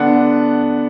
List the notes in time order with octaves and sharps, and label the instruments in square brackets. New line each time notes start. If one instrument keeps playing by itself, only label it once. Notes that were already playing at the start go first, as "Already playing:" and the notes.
Already playing: [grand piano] D3 B3 D4 F#5